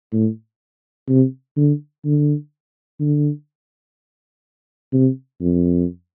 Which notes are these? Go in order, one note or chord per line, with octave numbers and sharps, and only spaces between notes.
A2
C3
D3
D3
D3
C3
F2